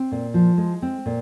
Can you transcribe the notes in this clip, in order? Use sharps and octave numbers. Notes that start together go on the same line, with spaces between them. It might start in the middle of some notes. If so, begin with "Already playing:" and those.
Already playing: C4
A#2
F3
G#3
C4
A#2